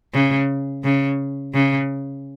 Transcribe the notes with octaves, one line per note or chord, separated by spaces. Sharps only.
C#3
C#3
C#3